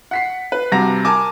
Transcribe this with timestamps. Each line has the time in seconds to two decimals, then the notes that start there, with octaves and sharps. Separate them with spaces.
0.11 F#5 B6 C7
0.52 B4
0.72 G2 C3 F#4 A#5 A#6
1.05 A#4 G#5 A5 D6